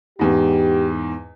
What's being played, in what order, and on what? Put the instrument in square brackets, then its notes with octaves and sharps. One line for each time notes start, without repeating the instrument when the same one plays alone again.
[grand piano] E2 G#2 [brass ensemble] G4